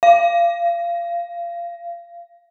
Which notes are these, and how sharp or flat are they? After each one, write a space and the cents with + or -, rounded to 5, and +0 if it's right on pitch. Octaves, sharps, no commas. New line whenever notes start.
F5 -25